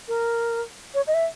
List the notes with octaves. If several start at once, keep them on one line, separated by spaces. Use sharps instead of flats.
A#4
C#5
D#5
E5